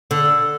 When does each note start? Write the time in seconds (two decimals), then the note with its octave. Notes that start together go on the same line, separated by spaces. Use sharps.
0.11 D3